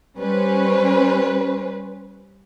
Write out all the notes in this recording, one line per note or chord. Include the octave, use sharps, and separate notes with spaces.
G3 C#4 B4 C5